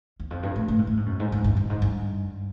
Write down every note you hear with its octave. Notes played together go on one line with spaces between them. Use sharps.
E2
F2
G2
A2
A2
G#2
A2
G#2
F#2
G#2
G#2
G2
G2
G#2
G2